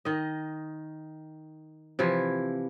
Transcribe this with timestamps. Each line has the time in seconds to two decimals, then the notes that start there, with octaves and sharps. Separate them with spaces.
0.05 D#3 D#5
1.99 C3 E3 F3 E4